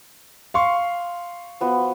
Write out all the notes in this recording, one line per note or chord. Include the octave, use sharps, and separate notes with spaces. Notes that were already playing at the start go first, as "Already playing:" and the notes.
F5 C6 C#6
F3 B3 F#4